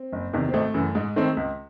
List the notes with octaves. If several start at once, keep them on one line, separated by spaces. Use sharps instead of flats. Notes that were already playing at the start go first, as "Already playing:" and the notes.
Already playing: C4
F#1
E2 C3 D#3
C4
G#1 A3
F#2 C#3 E3
G#2 G#3
D#3 A3 C4
C#2